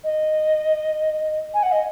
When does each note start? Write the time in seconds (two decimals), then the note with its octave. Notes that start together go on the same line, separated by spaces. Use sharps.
0.04 D#5
1.54 G#5
1.63 F#5
1.72 D#5